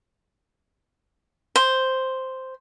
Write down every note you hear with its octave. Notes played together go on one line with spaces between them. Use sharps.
C5